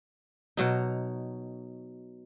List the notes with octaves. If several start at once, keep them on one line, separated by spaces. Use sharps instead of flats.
B2 F#3 D#4